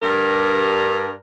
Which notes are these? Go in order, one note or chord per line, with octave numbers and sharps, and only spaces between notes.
G2 A#4